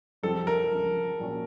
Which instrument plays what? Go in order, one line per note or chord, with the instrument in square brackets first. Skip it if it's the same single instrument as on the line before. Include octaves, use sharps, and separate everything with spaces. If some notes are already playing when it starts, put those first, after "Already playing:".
[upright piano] F2 C3 F3 C4 [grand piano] A4
[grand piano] A#4
[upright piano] C#2 C#3 F3
A#1 A#2 F#3 A#3 C#4